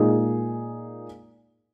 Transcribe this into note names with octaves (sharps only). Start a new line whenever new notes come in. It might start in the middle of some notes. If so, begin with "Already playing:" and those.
Already playing: A#2 G#3 D#4 G#4